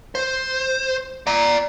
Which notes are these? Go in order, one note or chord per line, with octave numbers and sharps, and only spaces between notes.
C5
D5 A#5